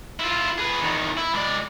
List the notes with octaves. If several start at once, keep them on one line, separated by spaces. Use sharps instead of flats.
E4 F4
G#4 B4
E2 D#3
E4
G#3 D5